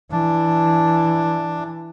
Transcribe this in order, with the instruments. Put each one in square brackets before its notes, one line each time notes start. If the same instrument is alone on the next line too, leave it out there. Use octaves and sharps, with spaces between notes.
[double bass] E3 [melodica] D4